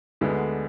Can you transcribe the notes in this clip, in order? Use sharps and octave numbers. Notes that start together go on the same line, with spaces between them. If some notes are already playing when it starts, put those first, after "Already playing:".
D2 D3 G#3 B3